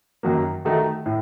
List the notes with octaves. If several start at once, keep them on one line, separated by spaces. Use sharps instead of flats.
F#2 D#3 F#3 A#3
D#3 A3 D#4 F#4
A2